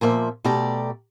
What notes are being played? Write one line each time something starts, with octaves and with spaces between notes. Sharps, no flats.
A#2 F3 A#3 E5
B2 A3 G4 D5 A#5